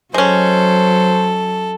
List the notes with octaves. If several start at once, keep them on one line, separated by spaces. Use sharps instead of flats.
F#3 G#3 C#4 A4 C5